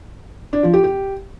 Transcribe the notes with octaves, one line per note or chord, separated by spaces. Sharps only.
D4
F3
G4
G4